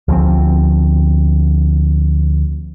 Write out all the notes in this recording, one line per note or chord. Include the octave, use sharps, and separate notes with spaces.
D2 F3 G3 C4